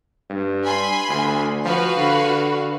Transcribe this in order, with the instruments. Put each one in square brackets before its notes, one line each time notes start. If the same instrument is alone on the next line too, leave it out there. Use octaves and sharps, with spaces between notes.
[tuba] G2
[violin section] G#5 B5 C6
[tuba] D2
[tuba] F3 [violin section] F#4 B4 F5
[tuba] D3